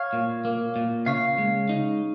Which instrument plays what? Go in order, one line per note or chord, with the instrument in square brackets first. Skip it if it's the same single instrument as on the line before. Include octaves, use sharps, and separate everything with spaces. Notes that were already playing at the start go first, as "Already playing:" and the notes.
Already playing: [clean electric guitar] C#5 F5
A#2
A#3
A#2
C#3 C#5 F5
G#3
D#4